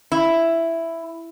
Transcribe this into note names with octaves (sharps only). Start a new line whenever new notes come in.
E4